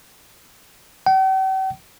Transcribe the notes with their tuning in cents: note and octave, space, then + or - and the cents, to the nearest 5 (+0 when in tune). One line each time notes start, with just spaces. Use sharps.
G5 -45